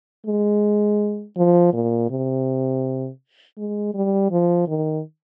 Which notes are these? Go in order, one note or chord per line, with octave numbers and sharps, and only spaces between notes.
G#3
F3
A#2
C3
G#3
G3
F3
D#3